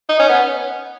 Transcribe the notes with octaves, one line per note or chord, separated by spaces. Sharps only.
D#4
C#4
B3